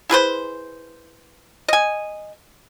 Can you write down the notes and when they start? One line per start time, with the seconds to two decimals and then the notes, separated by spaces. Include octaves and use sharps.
0.10 E4 G#4 B4 C5
1.69 D#5 G#5